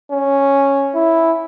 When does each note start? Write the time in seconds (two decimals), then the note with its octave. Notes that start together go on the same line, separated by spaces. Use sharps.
0.10 C#4
0.95 E4